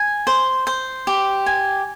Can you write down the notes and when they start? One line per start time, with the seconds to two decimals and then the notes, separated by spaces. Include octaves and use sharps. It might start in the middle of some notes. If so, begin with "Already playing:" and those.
Already playing: G#5
0.27 C5
0.67 C5
1.07 G4
1.46 G#5